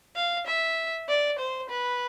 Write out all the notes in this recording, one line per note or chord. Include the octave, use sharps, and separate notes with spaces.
F5
E5
D5
C5
B4